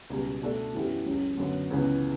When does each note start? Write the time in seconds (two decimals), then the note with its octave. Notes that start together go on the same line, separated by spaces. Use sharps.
0.10 C#2 B2 G3
0.42 B2 A3 D4 A4 D5
0.73 F#2 E3 B3 E4 G4
1.06 C#2 C#3 F#3
1.37 F#2 D3 F#3 B3
1.71 C#2 C#3 E3 B3